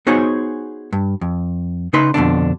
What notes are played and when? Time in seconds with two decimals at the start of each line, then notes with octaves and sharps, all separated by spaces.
0.07 B3 D#4 F#4 G#4 C5 C#5
0.92 G2
1.21 F2
1.93 C#3 D#4 B4 C6
2.14 F2 B2 D3 D4